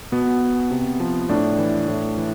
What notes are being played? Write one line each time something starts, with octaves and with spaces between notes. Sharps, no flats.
B2 B3
C3
F3
A2 D4
E3
A2
E3